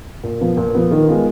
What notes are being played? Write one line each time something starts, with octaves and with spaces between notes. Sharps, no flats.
A#2
F3 B3
A#2
F3 B3
D#3
G#3 B3 F4